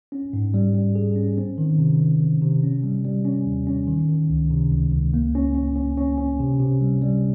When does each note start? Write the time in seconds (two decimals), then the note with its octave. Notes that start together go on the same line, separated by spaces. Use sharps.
0.12 C#4
0.33 G#2
0.54 G3
0.75 G3
0.95 G#4
1.16 C#4
1.38 C4
1.58 D#3
1.78 C3
2.00 D#3
2.20 D#3
2.42 C3
2.63 C#4
2.83 G3
3.05 G3
3.25 C#4
3.46 D#2
3.67 C#4
3.88 D#3
4.08 D#3
4.30 C#2
4.51 C3
4.72 C#2
4.92 C#2
5.14 A#3
5.35 C#4
5.55 C#4
5.76 C#4
5.97 C#4
6.18 C#4
6.40 C3
6.60 C3
6.81 G3
7.02 G3